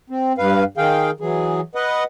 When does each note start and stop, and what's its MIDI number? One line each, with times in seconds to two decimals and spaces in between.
0.10 0.33 60
0.38 0.64 43
0.38 0.64 71
0.38 0.64 77
0.77 1.11 51
0.77 1.11 68
0.77 1.11 77
0.77 1.11 79
1.20 1.61 52
1.20 1.61 54
1.20 1.61 68
1.75 2.04 71
1.75 2.04 75
1.75 2.04 78